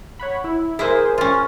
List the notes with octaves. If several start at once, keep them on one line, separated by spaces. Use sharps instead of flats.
C#5 F#5 B5
E4
A#3 E4 G#4 C5
C#4 F4